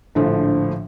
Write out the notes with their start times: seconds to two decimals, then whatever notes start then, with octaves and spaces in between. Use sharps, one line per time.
0.15 A#1 A2 D3 F3